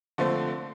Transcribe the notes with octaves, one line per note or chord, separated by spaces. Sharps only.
D3 F3 A3 C4